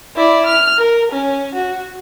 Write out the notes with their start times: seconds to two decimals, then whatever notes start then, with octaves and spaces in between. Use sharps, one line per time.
0.16 E4 D5
0.46 F6
0.79 A#4
1.12 C#4
1.55 F#4